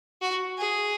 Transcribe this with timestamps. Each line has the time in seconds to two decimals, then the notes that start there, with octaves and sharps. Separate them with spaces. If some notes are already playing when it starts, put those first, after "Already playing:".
0.21 F#4
0.58 G#4